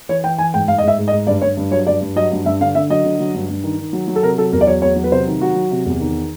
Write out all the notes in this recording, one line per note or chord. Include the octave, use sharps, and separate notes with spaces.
E3 C#5
E3 G5
E3 G#5
G#2 G5
G#2 F5
D#5
G#2 E5
G#2
D#5
G#2
G2 D5
G2 C#5
G2
F#3 C#5
G2 D5
G2
F#3 D#5
G2
G2 E5
D3 F5
D3 E5
F#3 D#5
D3
F#3
G2
G2
D#3
D#3
F#3
F#3
A4
C3 A#4
F#3 A4
E2 A#4
D5
F#3 C#5
E2 C#5
F#3
B4
C3 C5
D#3
F#3 F#4
F#3
C3
E2
D#3